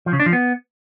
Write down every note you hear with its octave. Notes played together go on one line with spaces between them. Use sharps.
F3
C#3
D4
F3
B3